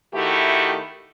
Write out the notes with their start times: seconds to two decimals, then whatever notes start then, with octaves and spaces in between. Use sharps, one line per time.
0.14 D#3 A3 E4 F#4 G4